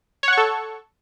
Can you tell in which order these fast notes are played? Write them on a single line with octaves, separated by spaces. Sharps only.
C#5 F#5 C#6 A4